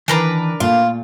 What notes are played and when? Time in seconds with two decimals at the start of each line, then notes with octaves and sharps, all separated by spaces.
0.08 D#3 E3 D4 A#4 B4
0.60 A#2 A3 F4 F5